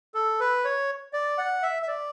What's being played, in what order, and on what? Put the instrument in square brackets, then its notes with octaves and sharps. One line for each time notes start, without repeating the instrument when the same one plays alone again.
[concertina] A4
B4
C#5
D5
F#5
E5
E5
D5